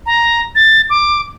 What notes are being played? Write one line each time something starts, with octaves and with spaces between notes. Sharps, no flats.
A#5
A6
D6